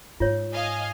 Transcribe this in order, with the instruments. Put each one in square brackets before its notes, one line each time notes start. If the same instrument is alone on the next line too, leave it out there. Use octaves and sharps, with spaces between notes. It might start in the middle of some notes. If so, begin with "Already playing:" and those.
[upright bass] G#2 [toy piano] F4 C#5
[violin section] D#5 F5 G#5